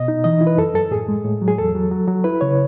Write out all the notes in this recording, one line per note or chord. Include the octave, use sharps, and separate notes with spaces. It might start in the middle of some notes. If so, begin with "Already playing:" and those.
Already playing: B2 D#5
D#4
E3 D#5
E4
B4
F#2 A4
F#2 A4
A2 G#4
G#3
A2
F#3
G#4
E2 A4
F#3
F#3
F#3
E4 B4
C#3 C#5